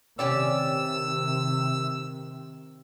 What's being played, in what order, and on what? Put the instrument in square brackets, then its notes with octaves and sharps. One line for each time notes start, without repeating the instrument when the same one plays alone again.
[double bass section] C3 D#3 [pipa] C#4 G4 D5 [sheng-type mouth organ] E6